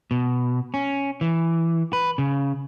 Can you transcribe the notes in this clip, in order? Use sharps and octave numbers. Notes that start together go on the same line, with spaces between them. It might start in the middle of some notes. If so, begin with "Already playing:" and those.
B2
C#4
E3
B4
C#3